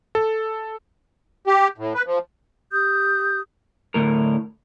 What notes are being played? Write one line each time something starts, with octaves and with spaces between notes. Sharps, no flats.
A4
G4
A2
B4
F3
G4 D#6 G6
D2 A2 A#4